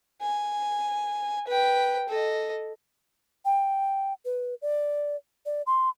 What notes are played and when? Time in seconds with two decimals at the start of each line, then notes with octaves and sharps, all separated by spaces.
0.22 G#5
1.47 B4 G5
2.09 A4 D#5
3.45 G5
4.25 B4
4.62 D5
5.46 D5
5.67 C6